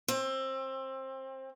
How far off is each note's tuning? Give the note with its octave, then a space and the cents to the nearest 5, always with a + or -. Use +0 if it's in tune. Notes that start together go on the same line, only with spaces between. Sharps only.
C4 +25